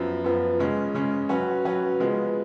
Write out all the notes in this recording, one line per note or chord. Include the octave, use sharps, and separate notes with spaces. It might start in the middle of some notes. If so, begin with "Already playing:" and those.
Already playing: F#2 F3 B3
F#2 F3 B3
C#3 G#3 C#4
C#3 G#3 C#4
F#3 C#4 F#4 B4
F#3 C#4 F#4 B4
C#3 F3 G#3 B3